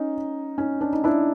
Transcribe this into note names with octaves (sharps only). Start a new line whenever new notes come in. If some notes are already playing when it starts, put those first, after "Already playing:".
Already playing: C#4 D#4
C#4 D#4
D4
D#4
D4 E4